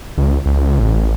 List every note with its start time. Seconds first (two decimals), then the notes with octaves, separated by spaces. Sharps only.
0.18 C#2
0.46 C#2
0.79 A1